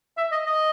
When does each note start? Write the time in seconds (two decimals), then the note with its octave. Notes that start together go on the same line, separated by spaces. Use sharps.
0.17 E5
0.31 D#5
0.46 D#5